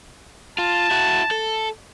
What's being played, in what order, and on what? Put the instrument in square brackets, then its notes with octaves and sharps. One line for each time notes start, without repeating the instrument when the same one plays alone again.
[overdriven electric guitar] F4 [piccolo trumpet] A5
[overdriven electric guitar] E4 F#4
A4